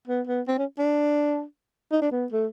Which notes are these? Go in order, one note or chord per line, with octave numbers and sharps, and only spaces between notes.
B3
B3
C4
C#4
D4
D#4
D4
B3
A3